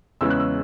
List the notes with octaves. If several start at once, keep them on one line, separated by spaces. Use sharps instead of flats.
E2 C#3 E3 G#3 C#4 E6
F#6
E6